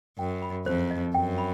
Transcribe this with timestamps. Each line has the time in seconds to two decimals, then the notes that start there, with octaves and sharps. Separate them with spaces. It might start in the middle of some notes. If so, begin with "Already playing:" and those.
0.19 F#2 G5
0.42 B5
0.66 F2 C5
0.91 D#5
1.14 F#2 G5
1.38 B5